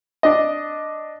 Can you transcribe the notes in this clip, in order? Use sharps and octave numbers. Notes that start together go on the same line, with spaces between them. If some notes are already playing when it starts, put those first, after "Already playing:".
D4 D#5